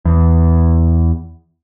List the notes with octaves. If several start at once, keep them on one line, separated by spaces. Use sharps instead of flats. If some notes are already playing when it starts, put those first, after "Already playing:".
E2